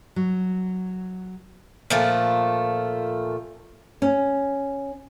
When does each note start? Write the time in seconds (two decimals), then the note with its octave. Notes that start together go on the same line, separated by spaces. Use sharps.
0.16 F#3
1.90 A#2 F3 A3
4.02 C#4